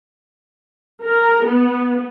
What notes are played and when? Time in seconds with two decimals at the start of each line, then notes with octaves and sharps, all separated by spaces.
1.02 A#4
1.44 B3